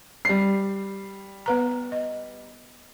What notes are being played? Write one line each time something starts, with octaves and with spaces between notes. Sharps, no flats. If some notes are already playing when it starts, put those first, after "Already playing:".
G3 C7
B3 B4 A#5
D#5